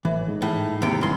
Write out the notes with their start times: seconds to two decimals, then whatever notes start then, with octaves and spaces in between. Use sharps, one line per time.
0.05 A1 E3
0.28 G#2
0.42 A2
0.82 D#2 C3 G5
1.01 G#1 G2 E3 C6